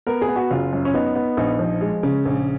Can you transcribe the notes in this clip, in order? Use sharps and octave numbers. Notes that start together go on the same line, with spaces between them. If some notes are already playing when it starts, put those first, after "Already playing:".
B3 A#4
G#4
B3
F#4
F#1 F4
F#2
C#4
B3 D#4
B3
A#1 D#4
F3
G#3
C#3
A#1